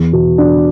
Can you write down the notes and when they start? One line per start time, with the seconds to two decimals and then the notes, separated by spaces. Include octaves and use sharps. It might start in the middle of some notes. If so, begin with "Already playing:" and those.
Already playing: E2
0.13 B2
0.38 D4